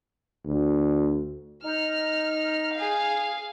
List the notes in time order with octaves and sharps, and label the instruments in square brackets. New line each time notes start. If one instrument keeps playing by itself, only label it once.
[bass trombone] D2
[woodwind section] D#4 [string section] F6
[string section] G#4 F5